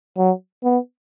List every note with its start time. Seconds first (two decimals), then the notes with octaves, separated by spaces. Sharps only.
0.17 F#3
0.64 B3